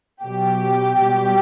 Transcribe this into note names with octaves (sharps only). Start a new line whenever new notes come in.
B2 F#3 G4
B2 G3